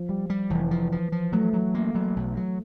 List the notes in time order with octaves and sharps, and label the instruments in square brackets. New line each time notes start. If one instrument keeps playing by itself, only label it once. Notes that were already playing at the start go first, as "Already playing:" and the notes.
Already playing: [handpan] F3
[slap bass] G3
G3
[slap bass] F1 [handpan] E3
[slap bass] F3
F3
F3
[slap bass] F#3 [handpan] A3
[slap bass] F#3
A#3
F#3
B1
F#3